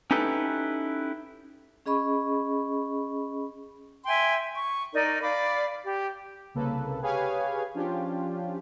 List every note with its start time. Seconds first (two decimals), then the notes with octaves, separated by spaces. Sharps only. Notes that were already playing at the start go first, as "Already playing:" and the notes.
0.11 C#4 D#4 E4 G4 A4 B4
1.86 C#4 G#4 D#5 B5 C#6
4.05 E5 G5 G#5 C6
4.54 C#6
4.93 D#4 A#4 D5
5.22 D5 F5 B5 D6
5.84 G4
6.54 C2 C#3 A#3 A4 B4
7.02 G4 G#4 B4 C#5 F5 G#5
7.74 F3 C#4 D4 F4 G4